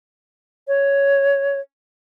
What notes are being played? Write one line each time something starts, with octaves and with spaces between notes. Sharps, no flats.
C#5